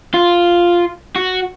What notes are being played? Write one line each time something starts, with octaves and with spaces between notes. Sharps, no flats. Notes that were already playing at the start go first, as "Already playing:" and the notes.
F4
F#4